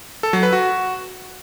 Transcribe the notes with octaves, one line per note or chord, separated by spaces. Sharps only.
A4
F#3
B4
F#4